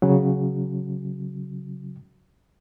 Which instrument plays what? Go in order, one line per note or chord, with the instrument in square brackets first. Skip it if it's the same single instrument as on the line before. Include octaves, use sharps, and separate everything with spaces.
[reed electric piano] C#3 F#3